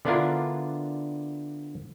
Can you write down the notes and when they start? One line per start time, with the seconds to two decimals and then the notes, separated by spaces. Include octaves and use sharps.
0.05 D3 B3 D4 E4 F4 A#4